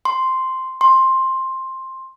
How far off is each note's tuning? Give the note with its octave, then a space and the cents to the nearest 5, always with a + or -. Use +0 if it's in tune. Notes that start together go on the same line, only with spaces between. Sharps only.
C6 -5
C6 +10